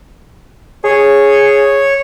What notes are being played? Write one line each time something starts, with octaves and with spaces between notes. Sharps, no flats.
G#4 C#5